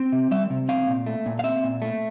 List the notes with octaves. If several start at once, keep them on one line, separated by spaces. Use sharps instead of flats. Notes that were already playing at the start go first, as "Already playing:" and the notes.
Already playing: C4
C3
G3 E5
C3
C4 F5
A#2
A3
A#2
F5
C4 E5
A#2
A3